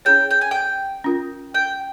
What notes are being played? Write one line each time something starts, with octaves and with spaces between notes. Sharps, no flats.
C#4 E4 G#4 C#5 G5
G5
G#5
G5
C#4 F4 A#4
G5